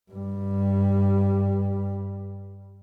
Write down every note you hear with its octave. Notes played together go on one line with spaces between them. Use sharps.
G2 G3